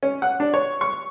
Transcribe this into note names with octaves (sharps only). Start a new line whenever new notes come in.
C#4
F#5
D4
C#5
C#6